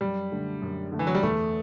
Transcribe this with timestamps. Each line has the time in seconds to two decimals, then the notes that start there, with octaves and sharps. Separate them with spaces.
0.01 F#2 G3
0.32 D3 A3
0.62 F#2
0.92 D3 A3
0.99 E3
1.07 F#3
1.14 G3
1.23 E2 A3